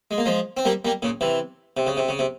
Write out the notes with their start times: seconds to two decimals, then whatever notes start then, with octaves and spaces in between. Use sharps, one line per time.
0.11 G#3
0.18 A#3
0.26 F3 G#3
0.57 C4
0.65 G3 A#3
0.85 G3 A#3
1.02 A#2 C#3
1.21 C3 E3
1.77 C3
1.87 C#3
1.97 C3
2.09 C#3
2.19 C3